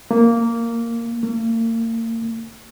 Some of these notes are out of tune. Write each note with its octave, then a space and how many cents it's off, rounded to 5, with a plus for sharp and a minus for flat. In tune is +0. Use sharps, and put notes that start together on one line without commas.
A#3 -10
A#3 -40